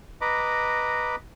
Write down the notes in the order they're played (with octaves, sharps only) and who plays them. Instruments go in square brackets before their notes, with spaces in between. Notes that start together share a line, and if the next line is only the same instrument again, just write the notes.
[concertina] B4 D#5 A#5 B5 D6